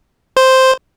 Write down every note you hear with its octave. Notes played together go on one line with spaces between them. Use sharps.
C5